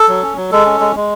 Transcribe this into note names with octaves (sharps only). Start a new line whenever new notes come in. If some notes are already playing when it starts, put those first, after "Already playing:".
Already playing: A4
F#3
C#4
F#3
G#3 A4
C#4
G#3
G#3